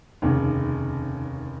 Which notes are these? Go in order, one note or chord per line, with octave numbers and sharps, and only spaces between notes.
F1 D#2 C#3